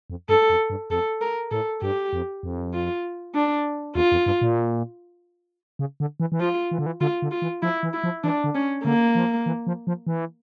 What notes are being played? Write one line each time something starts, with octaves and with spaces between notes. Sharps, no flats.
F2
G2 A4
F2
G2
F2 A4
A#4
A2 A4
G2 G4
F2
F2
F4
D4
E2 F4
F2
G2
A#2
C#3
D3
E3
E3
F3 F4
E3
D3
E3
D3 F4
D3
F4
E3
F3 E4
E3
E4
F3
E3 D4
D3
C#4
D3 A#3
F3
E3
F3
F3
E3